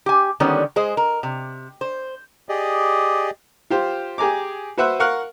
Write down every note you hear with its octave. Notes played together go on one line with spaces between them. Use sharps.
G4 G#5
D3 D#3 G3 G#3 B3 C#4
G#3 G#4 C5 D#5
A#4
C3
C5
G4 G#4 D5 D#5
F4 G4 C5
G4 G#4 G#5 A#5 D6
F#4 B4 C5 E5 F#5
A#4 F5 F#5 C#6 F6